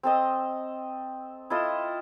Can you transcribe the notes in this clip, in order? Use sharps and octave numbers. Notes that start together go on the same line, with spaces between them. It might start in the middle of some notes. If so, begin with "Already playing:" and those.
C4 A4 D#5
E4 F4 A4 D#5